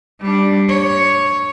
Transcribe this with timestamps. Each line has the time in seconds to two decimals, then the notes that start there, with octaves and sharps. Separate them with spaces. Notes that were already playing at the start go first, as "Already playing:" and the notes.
0.21 G3 D4
0.69 C#5